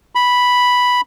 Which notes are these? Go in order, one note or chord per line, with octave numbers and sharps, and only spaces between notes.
B5